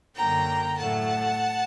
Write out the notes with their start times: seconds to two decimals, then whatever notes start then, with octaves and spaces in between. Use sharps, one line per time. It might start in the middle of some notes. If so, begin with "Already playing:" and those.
0.16 F#2 D3 F#3 A#3 G5 A#5
0.78 A2 F#3 A3 F#5 A5